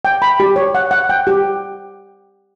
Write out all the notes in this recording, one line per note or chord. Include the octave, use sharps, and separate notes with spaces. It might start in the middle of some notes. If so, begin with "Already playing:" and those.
G5
B5
G4
C#5
F#5
F#5
G5
G4